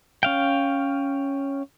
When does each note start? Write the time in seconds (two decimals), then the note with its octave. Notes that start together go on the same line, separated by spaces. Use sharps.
0.23 C#4 F5 G5